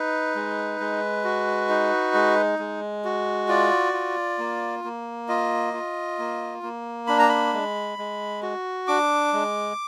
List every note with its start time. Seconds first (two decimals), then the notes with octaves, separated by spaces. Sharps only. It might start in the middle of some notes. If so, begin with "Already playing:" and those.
Already playing: D#4 B4
0.35 G#3
0.80 G#3
1.24 F#4
1.69 D#4
2.14 G#3
2.59 G#3
3.05 F#4
3.48 F4 D5
3.93 F4
4.39 A#3
4.84 A#3
5.28 F4 D#5
5.74 F4
6.19 A#3
6.63 A#3
7.07 D4 B5
7.19 A#5
7.29 B5
7.53 G#3
7.98 G#3
8.43 F#4
8.88 D4 D6
9.33 G#3